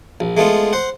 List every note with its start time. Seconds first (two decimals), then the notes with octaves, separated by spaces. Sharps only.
0.20 A#1
0.37 G#3 A3 B3 F4
0.73 C5 F#5